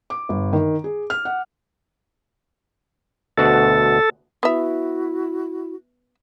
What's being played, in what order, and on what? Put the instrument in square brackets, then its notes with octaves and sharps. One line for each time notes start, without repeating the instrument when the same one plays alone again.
[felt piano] D6
G1
D#3
G#4
F6
F#5
[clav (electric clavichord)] D2 B2 F#4 [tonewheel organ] A4
[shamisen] B3 E5 [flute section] E4 F#4